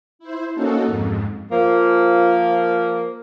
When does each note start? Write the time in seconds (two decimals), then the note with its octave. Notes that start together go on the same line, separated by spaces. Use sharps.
0.19 E4 C5
0.54 A#3 C#4 D#4 F#4 A4
0.86 F2 G#2
1.51 F3 A#3